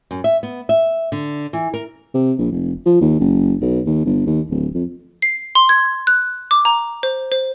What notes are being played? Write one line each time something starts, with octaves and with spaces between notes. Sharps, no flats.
F#2
E5
B3
E5
D3
E3
A#4
C3
A#1
F1
F3
D#2
F#1
B1
D#2
G1
D#2
D1
F2
C7
C6
G#6
F#6
D6
A#5
C5
C5